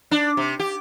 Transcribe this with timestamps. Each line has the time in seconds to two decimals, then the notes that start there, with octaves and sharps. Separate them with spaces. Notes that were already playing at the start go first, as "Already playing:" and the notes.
0.11 D4
0.37 C3
0.59 G4